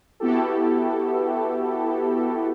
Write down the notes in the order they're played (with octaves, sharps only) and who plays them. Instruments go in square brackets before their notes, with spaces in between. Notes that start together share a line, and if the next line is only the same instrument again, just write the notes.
[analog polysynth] B3 E4 F#4 G4 A4